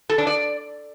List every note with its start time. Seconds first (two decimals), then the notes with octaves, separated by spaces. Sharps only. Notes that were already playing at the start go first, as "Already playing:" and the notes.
0.09 A4
0.18 D4
0.27 D5